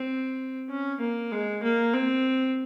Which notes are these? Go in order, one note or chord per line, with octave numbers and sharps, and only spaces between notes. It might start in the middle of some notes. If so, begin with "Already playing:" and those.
Already playing: C4
C#4
A#3
G#3
A#3
C4